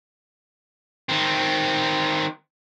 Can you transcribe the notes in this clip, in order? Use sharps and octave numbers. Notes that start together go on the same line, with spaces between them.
D#3 C4